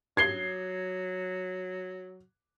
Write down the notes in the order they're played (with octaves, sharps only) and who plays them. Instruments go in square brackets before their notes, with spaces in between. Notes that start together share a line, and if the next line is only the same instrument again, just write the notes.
[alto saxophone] F#3 [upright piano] G#6 C7 G7